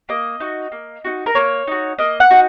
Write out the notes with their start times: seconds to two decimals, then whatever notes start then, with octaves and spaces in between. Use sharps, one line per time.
0.09 A#3 D#5
0.40 D#4 F#4
0.72 A#3
1.05 D#4 F#4
1.26 A#4
1.35 A#3 C#5
1.67 D#4 F#4
1.99 A#3 D#5
2.20 F#5
2.30 D#4 F#4